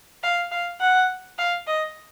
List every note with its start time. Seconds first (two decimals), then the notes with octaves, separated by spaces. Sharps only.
0.23 F5
0.52 F5
0.81 F#5
1.38 F5
1.67 D#5